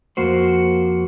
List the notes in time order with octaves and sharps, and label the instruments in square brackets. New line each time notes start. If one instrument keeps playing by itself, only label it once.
[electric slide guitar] F2 A#3 F#4 C5